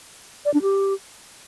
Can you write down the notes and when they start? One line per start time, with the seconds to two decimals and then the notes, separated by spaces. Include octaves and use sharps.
0.45 D5
0.54 D4
0.62 G4